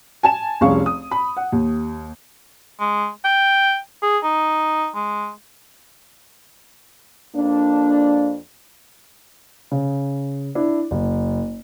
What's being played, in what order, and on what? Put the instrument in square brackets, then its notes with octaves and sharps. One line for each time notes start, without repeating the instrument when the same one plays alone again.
[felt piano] G#5 A5 E7
F1 C2 C#4 G#4 F5 C#6
D#6
B5
F#5
D#2
[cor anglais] G#3
G5
G#4
D#4
G#3
[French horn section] F2 A#3 D4
[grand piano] C#3
D4 E4
F#1